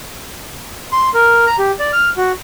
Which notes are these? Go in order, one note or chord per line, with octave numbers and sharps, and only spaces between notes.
C6
A#4
A#5
G4
D5
F6
F#4